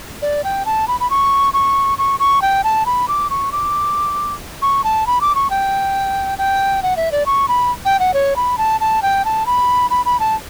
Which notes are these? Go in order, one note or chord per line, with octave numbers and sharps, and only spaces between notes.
D5
G5
A5
B5
B5
C#6
C#6
C#6
C#6
G5
A5
B5
D6
C#6
D6
C#6
A5
B5
D6
C#6
G5
G5
F#5
E5
D5
C#6
B5
G5
F#5
C#5
B5
A5
A5
G5
A5
B5
B5
B5
A5